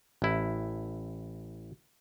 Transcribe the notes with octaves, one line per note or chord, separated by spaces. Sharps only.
A1 E4